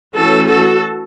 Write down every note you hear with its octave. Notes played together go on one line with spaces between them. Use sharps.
E3 A3 C#4 F#4 A4
F#4 A4